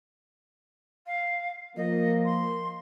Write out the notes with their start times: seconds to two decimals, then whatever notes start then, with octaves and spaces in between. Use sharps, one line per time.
1.06 F5
1.76 F3 A#3 D#5
2.24 C6